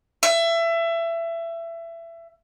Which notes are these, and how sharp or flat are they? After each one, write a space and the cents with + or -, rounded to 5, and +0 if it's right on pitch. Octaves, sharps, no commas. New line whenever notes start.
E5 +25